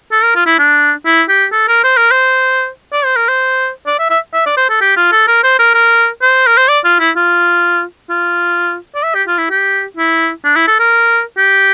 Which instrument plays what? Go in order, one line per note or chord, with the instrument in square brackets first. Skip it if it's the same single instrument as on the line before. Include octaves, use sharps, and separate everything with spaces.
[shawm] A4
A#4
F4
E4
D4
E4
G4
A4
A#4
C5
A#4
C5
D5
C5
A#4
C5
D5
E5
E5
E5
D5
C5
A4
G4
F4
A4
A#4
C5
A#4
A#4
C5
A#4
C5
D5
F4
E4
F4
F4
D5
E5
G4
F4
E4
G4
E4
D4
E4
A4
A#4
G4